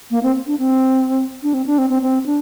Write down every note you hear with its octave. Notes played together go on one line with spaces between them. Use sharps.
A#3
C4
D4
C4
D4
C4
D4
C4
C4
C4
D4